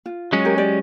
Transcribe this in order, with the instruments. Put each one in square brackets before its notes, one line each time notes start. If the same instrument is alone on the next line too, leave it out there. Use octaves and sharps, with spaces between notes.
[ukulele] F4
[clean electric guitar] F#3 G#3 C#4
[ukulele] G4 A#4
G4 D5